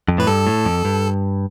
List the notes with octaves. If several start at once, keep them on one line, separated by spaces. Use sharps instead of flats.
F2
A2 B4
G2 A4
A2
F2
G2